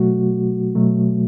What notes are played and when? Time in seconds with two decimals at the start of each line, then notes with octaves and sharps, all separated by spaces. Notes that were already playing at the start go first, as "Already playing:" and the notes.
Already playing: B2 F#3 A3 F#4
0.75 B2 F#3 A3